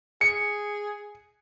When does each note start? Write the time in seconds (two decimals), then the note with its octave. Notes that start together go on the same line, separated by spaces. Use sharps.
0.21 G#4 C#7